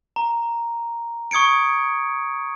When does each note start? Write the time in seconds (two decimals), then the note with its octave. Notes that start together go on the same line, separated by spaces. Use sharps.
0.16 A#5
1.31 C#6 D#6 G#6 C#7 D7